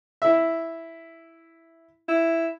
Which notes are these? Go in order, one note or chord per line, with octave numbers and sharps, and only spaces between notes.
E4 E5
E4